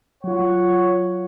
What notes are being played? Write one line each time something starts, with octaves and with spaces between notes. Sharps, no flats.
F#3 F4 C#5 F#5